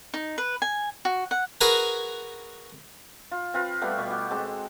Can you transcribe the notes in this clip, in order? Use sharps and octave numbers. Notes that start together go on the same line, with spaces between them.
D#4
B4
G#5
F#4
F#5
F#4 G#4 A#4 B4 G#5 A#5
F4
C4 F4 B4
G3 A3 B3 G4
B2 C#6 D6
G4 F#5
G#3 C4 A4